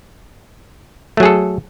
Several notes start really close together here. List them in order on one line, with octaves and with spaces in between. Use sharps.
A3 F#3 G#4 A4